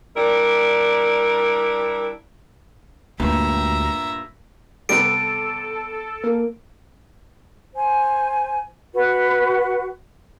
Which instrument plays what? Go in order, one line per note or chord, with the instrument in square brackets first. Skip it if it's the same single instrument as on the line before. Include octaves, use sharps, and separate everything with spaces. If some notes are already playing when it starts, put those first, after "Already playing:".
[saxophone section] G3 D4 E4 A#4 D5
[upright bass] D2 [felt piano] G2 A#2 [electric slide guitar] G#3 F#4 G4 [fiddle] E5 A#5
[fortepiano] C3 G3 B3 [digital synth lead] A4 [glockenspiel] D7
[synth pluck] A#3 A#4
[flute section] C5 G#5
F#4 B4